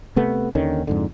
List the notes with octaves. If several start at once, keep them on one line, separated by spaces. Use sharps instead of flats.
C3 A3 B3
D#2 D3 D#3 C#4
F2 G#2 D3